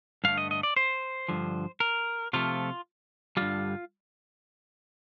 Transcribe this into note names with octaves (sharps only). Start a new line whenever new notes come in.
G2 D3 A3 F5
D#5
D#5
D5
C5
G2 D3 F3
A#4
C3 F3 A3 F4
G2 D3 G3 F4